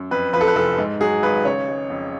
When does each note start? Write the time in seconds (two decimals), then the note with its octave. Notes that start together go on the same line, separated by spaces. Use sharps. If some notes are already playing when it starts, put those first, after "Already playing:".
Already playing: F#2
0.11 F2 B4
0.33 F3 B4
0.41 A4
0.48 B4
0.55 F1 A4
0.78 G#2
1.01 F#3 G#4
1.23 G#1 B4
1.45 C#3 C#5
1.68 G#3
1.90 F2